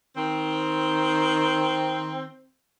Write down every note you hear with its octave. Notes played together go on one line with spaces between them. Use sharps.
D#3 C4